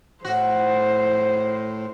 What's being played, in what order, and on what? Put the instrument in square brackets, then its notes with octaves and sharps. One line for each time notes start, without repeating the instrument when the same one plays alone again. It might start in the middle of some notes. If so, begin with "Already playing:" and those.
[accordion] A2 [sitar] F#4 [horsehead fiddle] C5